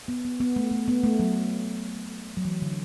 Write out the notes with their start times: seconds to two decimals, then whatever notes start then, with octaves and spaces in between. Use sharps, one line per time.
0.08 B3
0.25 B3
0.40 B3
0.56 A3
0.71 A3
0.88 B3
1.03 A3
1.19 F#3
2.37 F#3
2.45 E3
2.62 D3